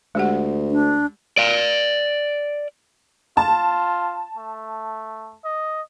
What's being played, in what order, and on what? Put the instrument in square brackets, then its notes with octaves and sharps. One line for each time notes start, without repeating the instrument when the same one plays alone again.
[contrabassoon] D2 [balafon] G#3 G4 F#5
[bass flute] D4
[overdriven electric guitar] D5 F5
[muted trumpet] F4 [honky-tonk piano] A5
[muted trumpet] A3
D#5